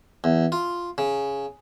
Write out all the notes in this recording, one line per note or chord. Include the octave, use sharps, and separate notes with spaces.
E2
F4
C#3